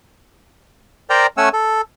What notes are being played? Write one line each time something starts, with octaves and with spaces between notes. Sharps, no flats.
A#4 C5 D5 G5 A#5
A3 C#4 F#5 G#5 E6
A4